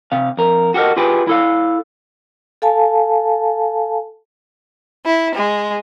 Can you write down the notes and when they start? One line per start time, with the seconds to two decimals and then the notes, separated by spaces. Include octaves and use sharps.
0.12 C3 F5
0.37 F2 A#4
0.74 F#4 G4 A4 A#4 D#5
0.96 F4 G4 G#4 B4 G5 G#5
1.27 E4 A4 F5
2.62 A4 F5 G#5 A5
5.05 E4
5.34 G#3